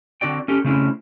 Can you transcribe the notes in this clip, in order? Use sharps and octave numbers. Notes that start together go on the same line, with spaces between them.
D3 C4 F#4 D5 G5
C#4 G4 A4
C#3 A3 C4 C#4 E4